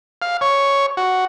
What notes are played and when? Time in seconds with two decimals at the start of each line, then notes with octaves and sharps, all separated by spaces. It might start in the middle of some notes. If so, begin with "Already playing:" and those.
0.22 F5
0.41 C#5
0.97 F#4